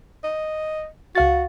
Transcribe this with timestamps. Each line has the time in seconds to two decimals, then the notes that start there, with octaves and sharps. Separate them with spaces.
0.24 D#5
1.15 C#2 F#4 F5 A6